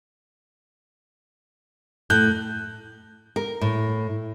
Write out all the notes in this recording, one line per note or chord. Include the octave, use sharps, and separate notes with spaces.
A2 F#6 G6
A#4
A2